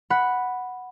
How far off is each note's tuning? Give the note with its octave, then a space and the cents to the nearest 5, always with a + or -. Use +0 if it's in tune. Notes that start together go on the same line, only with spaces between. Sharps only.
F#5 +0 B5 +0